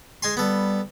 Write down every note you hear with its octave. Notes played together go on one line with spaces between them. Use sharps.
G#3 G#5 C6
G3 B3 A4